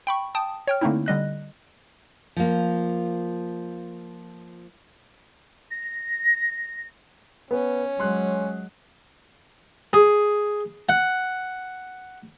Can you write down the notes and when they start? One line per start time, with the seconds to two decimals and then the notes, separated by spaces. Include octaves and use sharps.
0.07 G5 B5 C#6
0.35 G5 A5 D#6
0.68 C#5 G5 F6
0.81 D3 A3 A#3 C4 D#4 E4
1.06 D3 G3 D#5 F#6
2.37 F3 A#3
5.71 A#6
7.51 B3 C#4
8.00 F#3 G#3 C6 F#6
9.93 G#4
10.89 F#5